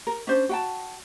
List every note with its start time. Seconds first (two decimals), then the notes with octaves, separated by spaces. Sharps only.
0.07 A#4
0.27 C#4 D4 C5
0.49 F#4 G5 A5